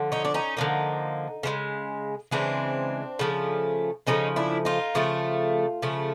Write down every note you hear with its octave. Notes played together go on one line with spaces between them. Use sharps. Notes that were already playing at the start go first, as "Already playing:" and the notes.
Already playing: D3 F3
C#4 D#4
D4
C#4 D#4
D3 F3 A#3
C#3 E3 G#3
C#3 E3 G#3 C4 D4
C#3 F3 A3
C#3 F3 A3 C#4 D#4
D4 E4
D#4 F4
C#3 F3 A3
C#3 F3 A3